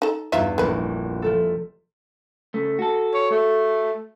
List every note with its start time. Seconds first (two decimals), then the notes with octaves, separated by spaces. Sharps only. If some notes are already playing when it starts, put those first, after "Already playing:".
0.02 D#4 A4
0.32 E2 G2 D#4 F4 E5
0.58 F1 A#1 D#3 B4
1.22 F3 A3 A4
2.54 C#3 A3
2.79 F#4 A4
3.14 C#5
3.31 A3